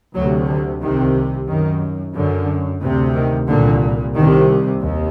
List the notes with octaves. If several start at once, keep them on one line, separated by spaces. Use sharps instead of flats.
D2 C3 F#3
D3
C2 C3 D#3
F#2 D#3
F#2 D3
D2 C3
D#3
C2 A#2 D3
C2 C3 D#3
D#2